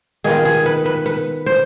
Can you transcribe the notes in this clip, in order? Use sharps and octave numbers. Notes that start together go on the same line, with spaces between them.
D#3 B3 F4 G#4
G#4
B4
B4
B4
C5